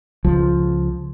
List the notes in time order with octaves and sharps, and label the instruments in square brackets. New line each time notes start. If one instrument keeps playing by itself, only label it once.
[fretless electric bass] C#2 F3